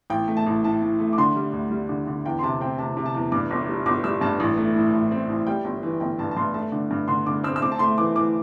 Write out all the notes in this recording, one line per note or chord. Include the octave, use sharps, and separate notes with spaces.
A1 G5
A3
A5
A1
A2 A5
A2
A3
D6
D3 C6
G3
D2
G3
D3
D3
E2 G5
C6
C3 A5
C4 G5
C3 A5
C3
A5
E2
G2 D6
G1
G3
G1 D6
G3 E6
G2 A5
A1
A3
A2
A1
C4
A1
G3 G5
G1
E3
G1 G5
G2 A5
A5
G2 C6
A3 A5
D3
G2
D3 C6
D3 D6
C4 E6
E6
C4 D6
A5
A3 C6
E3 D6
E3 D6